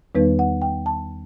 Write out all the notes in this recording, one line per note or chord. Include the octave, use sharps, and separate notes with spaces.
E2 D#3 G3 B3 D#4 B4
F#5
G5
A5